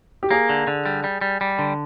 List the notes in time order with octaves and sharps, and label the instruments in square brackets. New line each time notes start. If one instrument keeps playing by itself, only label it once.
[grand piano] G4
[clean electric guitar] A#3 [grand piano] G#4
[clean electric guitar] D3
D3
G3
G3
G3
G3
D3